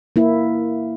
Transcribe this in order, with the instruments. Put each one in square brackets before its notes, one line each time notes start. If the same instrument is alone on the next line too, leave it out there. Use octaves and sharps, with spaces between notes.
[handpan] A#3 E4